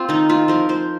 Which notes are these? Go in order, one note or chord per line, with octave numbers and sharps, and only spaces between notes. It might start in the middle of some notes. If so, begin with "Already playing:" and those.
Already playing: C4 F4
D#3 D#4
C4 F4
F3 A#4
F3 C5